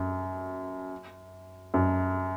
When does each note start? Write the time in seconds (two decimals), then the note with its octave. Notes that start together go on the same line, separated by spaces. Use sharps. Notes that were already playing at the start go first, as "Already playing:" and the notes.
Already playing: F#2
1.74 F#2